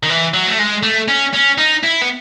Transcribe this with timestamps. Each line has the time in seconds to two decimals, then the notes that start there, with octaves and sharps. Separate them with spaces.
0.03 D#3
0.09 E3
0.34 F#3
0.47 A3
0.59 G#3
0.83 A3
1.08 C#4
1.34 C#4
1.58 D#4
1.83 E4
2.01 B3